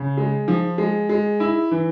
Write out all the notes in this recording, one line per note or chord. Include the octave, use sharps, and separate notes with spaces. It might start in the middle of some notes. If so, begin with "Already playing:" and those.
Already playing: C#3
G#3
F3
G#3
G#3
E4
E3